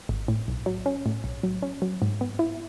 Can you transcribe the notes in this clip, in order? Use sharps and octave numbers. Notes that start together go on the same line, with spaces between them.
G#1
A2
B1
F#3
C#4
A2
B1
F#3
C#4
F#3
G#2
B3
E4